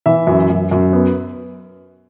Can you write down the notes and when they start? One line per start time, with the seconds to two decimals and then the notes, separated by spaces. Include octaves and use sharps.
0.06 E3 E5
0.27 F#2
0.50 F#2
0.71 F#2
0.93 B3